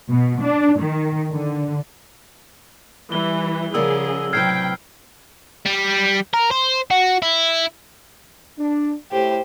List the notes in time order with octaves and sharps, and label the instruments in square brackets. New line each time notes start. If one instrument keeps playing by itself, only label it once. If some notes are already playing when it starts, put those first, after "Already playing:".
[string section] B2
D4
D#3
D3
[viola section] E3 [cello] G3 [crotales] G7
[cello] C#3 F3 [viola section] G#4 [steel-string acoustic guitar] A#4 D5 F#5 [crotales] E6
[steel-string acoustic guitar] A2 C3 B4 [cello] F#3 [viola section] G5 [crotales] F6 G#6 C7
[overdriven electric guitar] G3
A#4
C5
F#4
E4
[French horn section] D4
[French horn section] A2 [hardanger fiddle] G4 C5